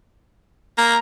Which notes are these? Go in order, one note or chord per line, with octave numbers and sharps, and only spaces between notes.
A#3 A#5